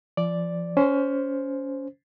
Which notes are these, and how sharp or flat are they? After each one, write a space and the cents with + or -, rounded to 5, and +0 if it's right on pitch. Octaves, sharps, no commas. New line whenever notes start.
F3 -30 D5 +0
C#4 +20 C5 +0